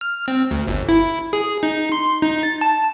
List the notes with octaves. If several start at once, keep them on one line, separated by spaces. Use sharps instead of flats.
F6
C4
D2
G1
E4
G#4
D#4
C6
D#4
A6
A5